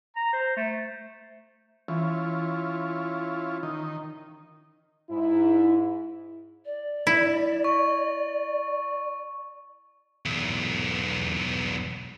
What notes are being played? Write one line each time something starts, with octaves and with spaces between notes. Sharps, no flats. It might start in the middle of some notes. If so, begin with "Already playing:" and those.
A#5
C5
A3
E3 C#4 E4 F4
D#3 D#4
G#2 E4
D5
E4
C#6
B1 E2